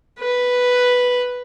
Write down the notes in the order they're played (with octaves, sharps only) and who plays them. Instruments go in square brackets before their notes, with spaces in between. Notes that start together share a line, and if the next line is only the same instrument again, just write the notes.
[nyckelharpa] B4